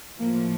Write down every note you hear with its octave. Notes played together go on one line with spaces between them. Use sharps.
A2 F3 A#3